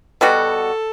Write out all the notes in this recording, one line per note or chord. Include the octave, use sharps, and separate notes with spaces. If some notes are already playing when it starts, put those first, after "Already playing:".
B2 G3 B3 F#4 A4